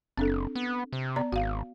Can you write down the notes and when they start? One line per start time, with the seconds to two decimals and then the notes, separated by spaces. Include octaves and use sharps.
0.17 F#1 C4 D4 A4
0.56 B3
0.93 C3
1.16 B3 D5 A#5
1.32 G#1 F#4 F5